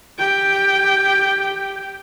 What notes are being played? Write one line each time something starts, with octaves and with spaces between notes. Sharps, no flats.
G4 G5